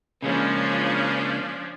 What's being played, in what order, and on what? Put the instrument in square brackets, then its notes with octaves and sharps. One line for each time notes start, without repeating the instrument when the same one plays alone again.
[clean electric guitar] C#3 G#3 A#3 [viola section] F3 C#4 D4